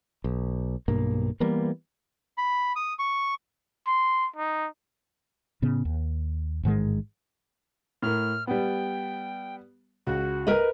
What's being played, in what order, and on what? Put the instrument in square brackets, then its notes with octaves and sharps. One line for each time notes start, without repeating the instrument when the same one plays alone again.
[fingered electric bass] B1
B1 G2 B2 A#3
E3 G3 A#3 B3
[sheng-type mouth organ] B5
D#6
C#6
[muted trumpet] C6
D#4
[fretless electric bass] A2 C#3 B3
D#2
A1 G#2 D#3 G#3
[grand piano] A2 A#4 [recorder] F6
[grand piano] G3 B3 [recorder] G5
[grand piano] C#2 [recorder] F#4
[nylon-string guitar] A#4 B4 D#5